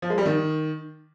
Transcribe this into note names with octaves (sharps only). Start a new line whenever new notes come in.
F3
G#3
G3
D#3